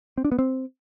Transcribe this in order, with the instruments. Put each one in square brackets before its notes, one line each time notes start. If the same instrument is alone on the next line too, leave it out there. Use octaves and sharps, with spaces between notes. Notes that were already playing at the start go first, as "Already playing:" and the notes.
[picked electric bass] C4
D4
B3
C4